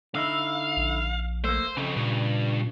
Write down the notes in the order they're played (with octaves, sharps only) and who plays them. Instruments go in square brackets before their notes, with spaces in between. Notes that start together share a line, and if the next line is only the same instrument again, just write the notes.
[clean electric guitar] D3 D#4 E4 [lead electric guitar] F5
[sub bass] A#1
[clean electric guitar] A3 A#3 [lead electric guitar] C5
[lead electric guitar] C2 F2 [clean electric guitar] C#3
[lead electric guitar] G2 [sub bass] A#2